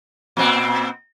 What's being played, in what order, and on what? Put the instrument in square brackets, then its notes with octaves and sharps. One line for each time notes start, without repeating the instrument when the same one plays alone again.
[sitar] A#2 B3 C4